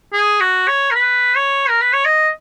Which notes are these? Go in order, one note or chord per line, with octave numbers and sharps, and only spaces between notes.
G#4
F#4
C#5
A#4
B4
C#5
A#4
B4
C#5
D#5